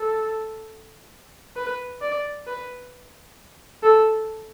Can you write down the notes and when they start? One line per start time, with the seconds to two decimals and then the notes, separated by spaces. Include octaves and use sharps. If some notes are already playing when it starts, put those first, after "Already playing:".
Already playing: A4
1.56 B4
2.01 D5
2.47 B4
3.83 A4